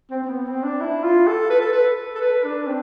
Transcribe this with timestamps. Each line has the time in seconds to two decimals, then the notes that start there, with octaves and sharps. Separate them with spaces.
0.11 C4
0.23 C4
0.28 B3
0.46 C4
0.63 D4
0.81 E4
1.03 F4
1.27 A4
1.50 B4
1.61 A4
1.72 B4
2.15 A4
2.21 B4
2.44 D4
2.67 C4